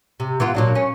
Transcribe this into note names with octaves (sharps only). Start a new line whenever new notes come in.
C3
E3 B3 F4
A#2 F#3 D4
C#4